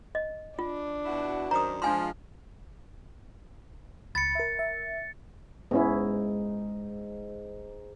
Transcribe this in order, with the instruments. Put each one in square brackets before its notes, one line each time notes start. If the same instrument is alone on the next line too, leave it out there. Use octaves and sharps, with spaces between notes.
[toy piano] D#5
[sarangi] D4 [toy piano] F4
[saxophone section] B2 E4 F#4
[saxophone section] F#2 D#3 C5 [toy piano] A#5 D#6
[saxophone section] F3 G#3 [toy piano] D4 G#5 C6
[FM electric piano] C#2 B5 [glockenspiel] A6 C#7
[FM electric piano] A#4 E5
E5
[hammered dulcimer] G#2 [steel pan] B3 C#4 E4